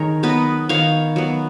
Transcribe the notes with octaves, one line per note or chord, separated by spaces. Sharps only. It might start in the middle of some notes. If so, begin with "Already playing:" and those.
Already playing: D#3 D#4 G#4 A#4 C#5
F#3 B3 B4 D#5
D#3 C#5 F5
F#3 B3